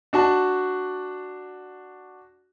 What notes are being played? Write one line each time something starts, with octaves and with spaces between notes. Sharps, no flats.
D4 F#4 A5